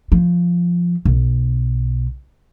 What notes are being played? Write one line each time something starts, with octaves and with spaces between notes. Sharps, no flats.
F3
B1